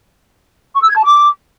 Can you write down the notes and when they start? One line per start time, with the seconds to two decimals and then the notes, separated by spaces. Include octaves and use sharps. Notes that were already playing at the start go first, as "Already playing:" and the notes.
0.75 C#6
0.82 E6
0.89 G#6
0.96 A5
1.03 D6